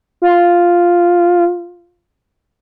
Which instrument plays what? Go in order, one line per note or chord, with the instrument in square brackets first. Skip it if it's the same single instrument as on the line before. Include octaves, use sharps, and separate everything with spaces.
[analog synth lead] F4